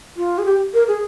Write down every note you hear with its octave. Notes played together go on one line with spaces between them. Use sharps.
F4
G#4
G4
A#4
G#4